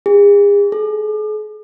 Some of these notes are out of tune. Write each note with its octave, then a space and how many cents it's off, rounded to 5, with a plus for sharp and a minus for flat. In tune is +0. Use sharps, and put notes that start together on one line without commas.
G#4 -40
G#4 +45